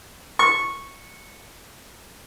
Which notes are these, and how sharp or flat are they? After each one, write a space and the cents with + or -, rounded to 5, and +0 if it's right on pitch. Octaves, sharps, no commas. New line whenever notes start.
C#6 -10